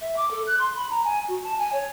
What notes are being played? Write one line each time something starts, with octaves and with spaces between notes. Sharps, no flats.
E5
D6
A4
F#6
C6
B5
A#5
G#5
F#4
A5
G#5
C#5